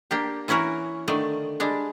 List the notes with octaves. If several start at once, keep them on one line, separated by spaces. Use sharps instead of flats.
A#3 D4 G4
E3 C#4 E4 F#4 A#4
D3 D#3 A3 D5
G3 G#3 D4